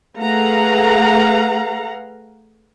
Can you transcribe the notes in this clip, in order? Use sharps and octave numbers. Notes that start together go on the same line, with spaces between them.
A3 G#4 B4 F5 F#5 A#5